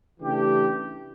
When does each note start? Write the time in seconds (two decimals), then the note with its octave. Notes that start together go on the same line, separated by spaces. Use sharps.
0.20 C#3 E3 A3 D4 G4